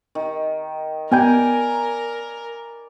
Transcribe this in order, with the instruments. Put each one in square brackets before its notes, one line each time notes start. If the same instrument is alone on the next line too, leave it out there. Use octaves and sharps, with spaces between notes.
[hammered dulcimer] D#3
[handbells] B3 G5 G6 [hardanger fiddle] A#4 [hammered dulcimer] D5 G#5 B5